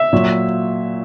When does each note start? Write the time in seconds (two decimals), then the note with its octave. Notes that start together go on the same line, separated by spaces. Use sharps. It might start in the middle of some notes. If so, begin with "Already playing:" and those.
Already playing: E5
0.13 A#2 F#3